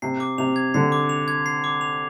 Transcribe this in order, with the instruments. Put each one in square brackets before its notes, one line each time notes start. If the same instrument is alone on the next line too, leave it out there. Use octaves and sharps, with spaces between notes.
[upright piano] C3 [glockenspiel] C7
[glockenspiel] D6
[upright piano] C3 [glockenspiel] F7
[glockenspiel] G#6
[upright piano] D3 [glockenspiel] C7
[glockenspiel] D6
F7
G#6
C7
D6
F7